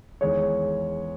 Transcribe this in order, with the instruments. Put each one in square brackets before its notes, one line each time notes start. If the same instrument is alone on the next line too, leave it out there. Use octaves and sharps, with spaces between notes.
[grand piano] E2 D#3 G#3 [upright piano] C#5